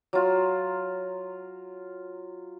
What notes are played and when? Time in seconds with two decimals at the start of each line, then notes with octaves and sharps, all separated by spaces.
0.13 F#3 F4